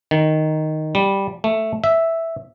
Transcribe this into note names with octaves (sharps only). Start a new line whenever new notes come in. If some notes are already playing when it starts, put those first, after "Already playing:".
D#3
G3
A3
E5